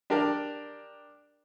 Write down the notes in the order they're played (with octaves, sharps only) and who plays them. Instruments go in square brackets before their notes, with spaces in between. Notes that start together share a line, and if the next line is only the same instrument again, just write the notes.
[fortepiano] D4 G4 A#4 D5